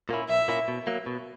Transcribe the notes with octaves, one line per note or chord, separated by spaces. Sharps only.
A#2 A#3 C#4 E4
B1 E5
A#2 A#3 C#4 E4
B2
F#3 A#3
B2